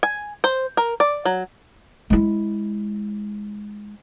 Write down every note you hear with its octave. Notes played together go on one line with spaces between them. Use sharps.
G#5
C5
A#4
D5
F#3
G#3 E4